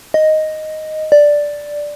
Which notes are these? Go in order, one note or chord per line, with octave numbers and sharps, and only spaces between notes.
D#5
D5